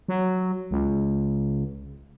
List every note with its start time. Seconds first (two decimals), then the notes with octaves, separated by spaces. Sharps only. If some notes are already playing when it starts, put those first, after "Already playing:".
0.08 F#3
0.71 C#2